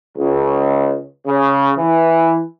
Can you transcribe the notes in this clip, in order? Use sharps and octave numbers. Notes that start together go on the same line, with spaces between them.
C#2
C#3
E3